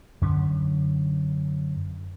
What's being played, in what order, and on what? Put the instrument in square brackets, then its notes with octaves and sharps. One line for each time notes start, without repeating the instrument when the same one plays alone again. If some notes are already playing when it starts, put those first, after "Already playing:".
[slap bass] F#2 D3 C#4